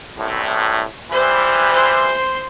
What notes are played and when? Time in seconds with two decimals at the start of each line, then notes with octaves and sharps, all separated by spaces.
0.18 C2 A2
1.12 E3 G3 C5
1.73 C5 C6